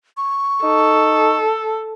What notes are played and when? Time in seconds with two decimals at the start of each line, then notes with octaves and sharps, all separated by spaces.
0.17 C#6
0.63 D#4 A4